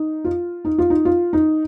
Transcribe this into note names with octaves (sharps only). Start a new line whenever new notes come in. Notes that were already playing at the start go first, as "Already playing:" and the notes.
Already playing: D#4
F4
D#4
F4
D#4
F4
D#4